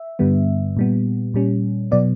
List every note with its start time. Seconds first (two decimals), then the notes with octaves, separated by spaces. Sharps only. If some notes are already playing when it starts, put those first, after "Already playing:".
Already playing: E5
0.19 G2 D3 G3 B3
0.77 A#2 G3 B3
1.34 A#2 G3 C#4
1.91 B2 F#3 B3 D5